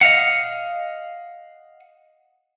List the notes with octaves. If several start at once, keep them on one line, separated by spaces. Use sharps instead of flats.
D#5 F5 F#5